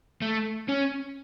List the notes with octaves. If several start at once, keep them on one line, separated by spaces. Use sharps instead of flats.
A3
C#4